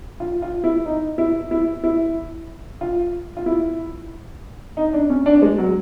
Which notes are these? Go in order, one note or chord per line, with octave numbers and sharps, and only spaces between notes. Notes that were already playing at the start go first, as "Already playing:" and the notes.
F4
F4
E4
D#4
E4
E4
E4
F4
F4
E4
D#4
D4
C#4
D4
G#3
F#3